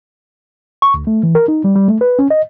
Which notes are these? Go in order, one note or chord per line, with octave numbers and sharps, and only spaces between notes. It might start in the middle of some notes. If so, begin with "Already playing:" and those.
C#6
D2
A3
E3
A#4
D#4
G3
G3
A3
B4
C#4
D#5